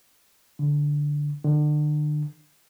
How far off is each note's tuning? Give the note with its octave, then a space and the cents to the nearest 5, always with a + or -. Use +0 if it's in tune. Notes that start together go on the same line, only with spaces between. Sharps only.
D3 -5
D3 +35